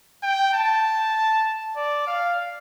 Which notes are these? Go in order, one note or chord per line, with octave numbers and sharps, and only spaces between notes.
G5
A5
D5
F5